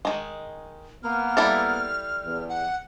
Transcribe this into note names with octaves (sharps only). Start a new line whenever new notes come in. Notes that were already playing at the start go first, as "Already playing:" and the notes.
D#3 G#3
A#3 B3 F6
G3 E4 A4
E2
F#5